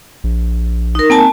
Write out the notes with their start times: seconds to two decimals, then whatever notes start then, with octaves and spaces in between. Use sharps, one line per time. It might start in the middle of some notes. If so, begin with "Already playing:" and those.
0.24 A#1
0.95 D#4 A#4
1.10 A#3 C4 G#5 A5